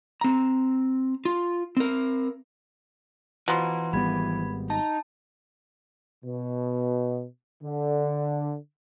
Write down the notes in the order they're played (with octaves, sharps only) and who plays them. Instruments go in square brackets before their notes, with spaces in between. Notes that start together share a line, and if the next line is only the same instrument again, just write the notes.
[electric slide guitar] C4 A#5
F4
C4 A#4
[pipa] B2 F3 [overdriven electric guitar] E3 [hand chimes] B4 A#5 C6
[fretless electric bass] G#1 G3 B3 [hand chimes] B5 G#6
[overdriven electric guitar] D#4 [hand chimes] A5
[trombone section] B2
D3